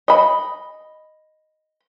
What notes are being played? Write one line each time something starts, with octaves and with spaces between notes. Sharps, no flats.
D#5 B5